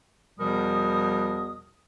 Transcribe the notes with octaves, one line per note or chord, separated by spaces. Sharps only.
E2 B2 F3 G3 A#4 D#6